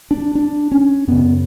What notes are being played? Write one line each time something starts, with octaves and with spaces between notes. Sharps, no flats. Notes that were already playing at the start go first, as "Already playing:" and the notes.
D4
D4
C#4
F#2 C#3 B3